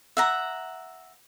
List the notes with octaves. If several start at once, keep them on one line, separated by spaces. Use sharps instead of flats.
E5 F#5 A#5